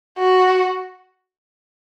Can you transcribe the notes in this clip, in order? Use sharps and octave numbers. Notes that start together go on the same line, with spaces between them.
F#4